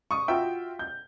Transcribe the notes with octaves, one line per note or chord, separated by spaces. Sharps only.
C#6 D#6
F4 F#4 E5 G5
G6